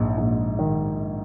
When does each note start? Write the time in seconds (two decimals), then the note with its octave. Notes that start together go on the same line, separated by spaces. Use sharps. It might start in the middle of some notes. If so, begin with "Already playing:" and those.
Already playing: A#1 G#2
0.18 A#1
0.59 D#3